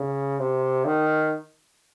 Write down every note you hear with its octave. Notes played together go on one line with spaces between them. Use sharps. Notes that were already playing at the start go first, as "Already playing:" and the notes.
Already playing: C#3
C3
D#3